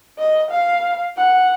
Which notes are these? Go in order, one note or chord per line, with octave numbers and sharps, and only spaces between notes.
D#5
F5
F#5